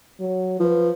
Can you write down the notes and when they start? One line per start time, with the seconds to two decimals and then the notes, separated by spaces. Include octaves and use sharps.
0.20 F#3
0.60 F3 B4